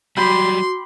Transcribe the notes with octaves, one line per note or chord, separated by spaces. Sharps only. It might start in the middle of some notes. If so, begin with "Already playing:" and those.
F#3 G3 F#4 G5 B5 C6 D6